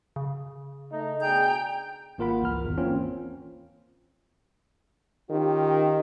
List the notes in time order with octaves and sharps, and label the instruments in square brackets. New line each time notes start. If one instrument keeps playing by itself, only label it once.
[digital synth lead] C#3
[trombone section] A3 D#4
[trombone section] B2 D4 G#4 [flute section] G5 A#5 G6
[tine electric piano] G#1 A#3 F4 A#4 F#5 B5
C#2 E3 A#4 F6
G#1 E2
E3 A#3 C4 C#4 F4
[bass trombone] D#3 [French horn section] C#4 F4 G4